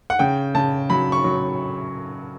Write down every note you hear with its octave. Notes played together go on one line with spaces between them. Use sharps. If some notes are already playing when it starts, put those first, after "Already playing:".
F#5
C#3 G5
C#3 A5
F#3 B5
C#6
F#3